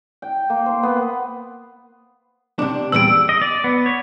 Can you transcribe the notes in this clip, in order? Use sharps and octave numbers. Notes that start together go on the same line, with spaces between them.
G5
A#3
C5
B3
C3 D4
E2 A#2 G3 E6 D7
D#5
D5
B3
C#5